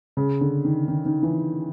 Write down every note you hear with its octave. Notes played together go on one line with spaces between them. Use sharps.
C#3
D3
D#3
D#3
D#3
E3